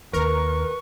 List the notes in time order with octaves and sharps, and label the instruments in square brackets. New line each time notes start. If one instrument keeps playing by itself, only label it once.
[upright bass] D#2 [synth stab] A#4 [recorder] B4 [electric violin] C#6